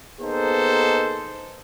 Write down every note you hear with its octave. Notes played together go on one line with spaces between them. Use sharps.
A#3 B3 D#4 G#4 A4 C5